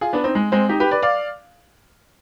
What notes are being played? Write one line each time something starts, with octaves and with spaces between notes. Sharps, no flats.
F4 G#4
B3 D4
C4 D#4
G#3
G#3 C4
D#4 G4
G4 B4
B4 D5
D5 F5